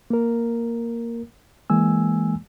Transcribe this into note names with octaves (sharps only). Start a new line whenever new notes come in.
A#3 A#4
E3 G#3 A#3 G#5 E6